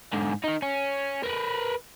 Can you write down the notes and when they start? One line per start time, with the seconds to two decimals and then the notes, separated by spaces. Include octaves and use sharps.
0.13 G#2 D3
0.44 D#3 D#4
0.62 C#4
1.24 A#4 B4